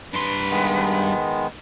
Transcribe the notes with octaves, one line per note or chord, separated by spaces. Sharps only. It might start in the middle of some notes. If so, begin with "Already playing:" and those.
G2 B4 C6
D#3 G#3 B3